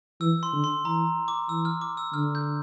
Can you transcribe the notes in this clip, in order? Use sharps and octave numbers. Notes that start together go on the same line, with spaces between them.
E3 E6
C6
D3
C6
E3 A#5
D6
E3 E6
F6
D6
E6
D3 F6
G6